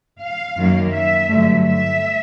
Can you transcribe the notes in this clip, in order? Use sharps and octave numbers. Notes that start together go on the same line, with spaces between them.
F5
F#2 D#3 F#3 A#3
E5
G2 D3 F#3 A3
E5